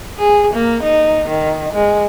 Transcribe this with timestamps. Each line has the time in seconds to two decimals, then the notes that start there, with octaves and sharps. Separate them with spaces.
0.19 G#4
0.54 A#3
0.84 D#4
1.29 D#3
1.74 G#3